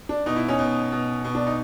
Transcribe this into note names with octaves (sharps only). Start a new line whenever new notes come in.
D4
B2 D#4
E4
C#4 D#4
B2
B2
B2
D4
D#4